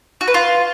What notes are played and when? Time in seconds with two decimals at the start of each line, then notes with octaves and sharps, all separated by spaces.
0.21 F#4
0.28 B4
0.34 F4